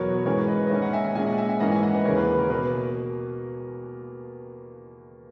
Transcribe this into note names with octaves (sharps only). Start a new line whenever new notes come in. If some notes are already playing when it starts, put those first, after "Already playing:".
Already playing: E2 B2 F#3 B3 A#4 C#5
B4
G#2 E3 G#3 C#4 A#4 C#5
B4 D#5
D#5
G#2 D#3 A#3 C#4 C#5 E5
D#5 F#5
E5 G#5
E5 G#5
A#2 G#3 C#4 E5 G#5
D#5 F#5
E5 G#5
E5 G#5
G#2 E3 A#3 C#4 D#5 F#5
E5 G#5
D#5 F#5
B4 D#5
D#2 C#3 E3 A#3 C#4 A#4 C#5
B4
B4
A#4
B2 A#3 B4